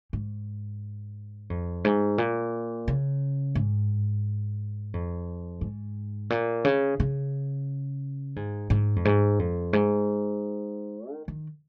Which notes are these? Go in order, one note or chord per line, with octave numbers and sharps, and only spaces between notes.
G#2
F2
G#2
A#2
C#3
G#2
F2
G#2
A#2
C#3
C#3
G#2
G#2
F2
G#2
F2
G#2
D#3
D#3